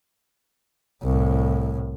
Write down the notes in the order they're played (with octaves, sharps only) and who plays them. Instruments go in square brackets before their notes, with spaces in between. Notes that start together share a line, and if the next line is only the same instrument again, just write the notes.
[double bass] C2 A2